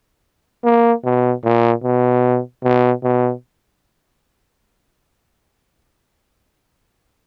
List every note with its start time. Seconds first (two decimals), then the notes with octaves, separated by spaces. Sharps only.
0.64 A#3
1.05 B2
1.44 A#2
1.84 B2
2.64 B2
3.04 B2